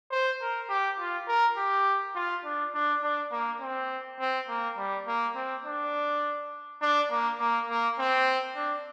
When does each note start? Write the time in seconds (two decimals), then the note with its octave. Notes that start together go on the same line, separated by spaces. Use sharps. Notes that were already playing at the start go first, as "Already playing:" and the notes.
0.11 C5
0.41 A#4
0.69 G4
0.99 F4
1.28 A#4
1.57 G4
2.15 F4
2.44 D4
2.74 D4
3.02 D4
3.32 A#3
3.61 C4
4.19 C4
4.48 A#3
4.77 G3
5.07 A#3
5.35 C4
5.65 D4
6.81 D4
7.11 A#3
7.40 A#3
7.69 A#3
7.98 C4
8.56 D4